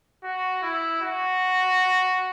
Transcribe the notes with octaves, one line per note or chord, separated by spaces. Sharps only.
F#4
E4
F#4